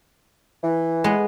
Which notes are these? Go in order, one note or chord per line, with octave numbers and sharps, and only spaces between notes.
E3
G#3 B3